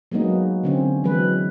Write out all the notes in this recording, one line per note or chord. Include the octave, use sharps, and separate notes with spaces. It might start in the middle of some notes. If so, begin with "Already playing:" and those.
F#3 G#3 A#3 B3 D#4
D3 C4 C#4
E3 F#3 G#3 B4